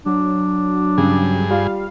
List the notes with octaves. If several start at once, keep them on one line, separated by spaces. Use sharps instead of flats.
F#3 D4
G2 C#3 G#4
G3 F4 F5